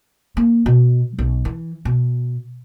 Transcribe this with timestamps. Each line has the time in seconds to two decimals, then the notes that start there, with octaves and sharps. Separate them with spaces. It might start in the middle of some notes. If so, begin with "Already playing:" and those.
0.37 A#3
0.66 B2
1.19 B1
1.45 E3
1.85 B2